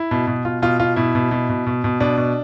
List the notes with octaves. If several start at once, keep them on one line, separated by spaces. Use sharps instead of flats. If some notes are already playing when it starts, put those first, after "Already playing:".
Already playing: E4
B2
B2
B2 F4
B2 F4
B2 F4
B2 E4
B2
B2
B2
B2
B2
B2 D4
B2